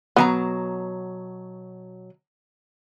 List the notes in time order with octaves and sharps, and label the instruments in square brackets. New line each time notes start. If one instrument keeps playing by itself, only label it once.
[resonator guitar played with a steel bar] B2 F#3 A#5 [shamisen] B3